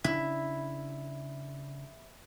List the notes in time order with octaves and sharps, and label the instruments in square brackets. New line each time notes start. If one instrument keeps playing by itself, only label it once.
[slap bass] C#3 D4 [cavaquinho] E4